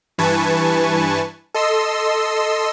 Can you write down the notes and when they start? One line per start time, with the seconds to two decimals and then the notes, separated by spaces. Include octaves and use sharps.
0.18 G2 E3 B4 G#5 A5 C#6
1.54 A4 D#5 C6 E6